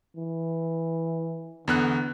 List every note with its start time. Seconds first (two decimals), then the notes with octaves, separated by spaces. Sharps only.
0.17 E3
1.68 E2 D3 B3 F#6